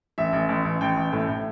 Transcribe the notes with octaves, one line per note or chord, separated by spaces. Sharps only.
A1 E5
A1
A1
A1
A1 G5
A1
A2
A2